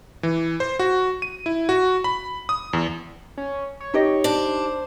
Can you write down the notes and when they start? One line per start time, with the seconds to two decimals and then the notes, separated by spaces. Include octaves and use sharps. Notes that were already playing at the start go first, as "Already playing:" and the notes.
0.23 E3
0.60 C5
0.79 F#4
1.22 D#7
1.46 E4
1.69 F#4
2.04 B5
2.49 D#6
2.73 E2
3.38 C#4
3.81 C#5
3.94 D#4 G4 D#5
4.24 D4 C5